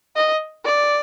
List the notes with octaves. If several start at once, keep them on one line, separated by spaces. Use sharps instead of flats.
D#5
D5